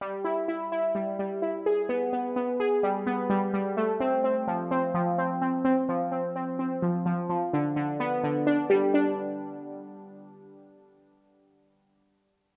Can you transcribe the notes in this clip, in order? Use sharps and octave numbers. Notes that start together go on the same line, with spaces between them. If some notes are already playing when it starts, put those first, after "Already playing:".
G3
E4
E4
E4
G3
G3
E4
G#4
B3
B3
B3
G#4
G3
B3
G3
G3
A3
C4
C4
F3
C4
F3
C4
C4
C4
F3
C4
C4
C4
F3
F3
F3
D3
D3
B3
D3
D4
G3
D4